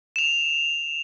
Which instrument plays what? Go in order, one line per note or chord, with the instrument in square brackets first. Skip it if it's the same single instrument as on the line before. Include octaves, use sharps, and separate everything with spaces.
[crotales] E7 F7